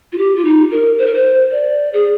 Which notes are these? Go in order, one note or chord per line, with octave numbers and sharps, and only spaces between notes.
F4
G4
F4
D#4
A#4
C5
A#4
C5
D5
G#4